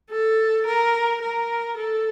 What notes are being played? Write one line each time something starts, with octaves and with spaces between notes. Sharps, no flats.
A4
A#4
A#4
A4